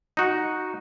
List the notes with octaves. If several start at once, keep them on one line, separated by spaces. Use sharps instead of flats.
D#4 F#4